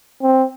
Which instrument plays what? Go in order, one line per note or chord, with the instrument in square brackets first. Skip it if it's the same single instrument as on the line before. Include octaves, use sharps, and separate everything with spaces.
[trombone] C4